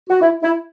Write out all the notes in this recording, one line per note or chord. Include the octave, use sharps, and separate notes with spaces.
F#4
E4
E4